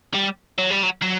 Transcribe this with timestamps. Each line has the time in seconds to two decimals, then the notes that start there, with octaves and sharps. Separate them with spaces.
0.15 G3
0.59 F#3
0.71 G3
0.83 F#3
1.02 F#3